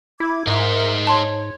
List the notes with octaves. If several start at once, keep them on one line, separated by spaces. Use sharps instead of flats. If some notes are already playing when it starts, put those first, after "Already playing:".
E4 D6 G#6
G#2 D#4 A#4 C5 E5
C#5 A5 C6